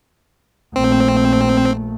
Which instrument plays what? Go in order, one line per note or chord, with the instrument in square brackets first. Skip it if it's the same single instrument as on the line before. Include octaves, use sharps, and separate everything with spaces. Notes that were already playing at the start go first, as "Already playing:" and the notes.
[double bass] A#1 A3 [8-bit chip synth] C4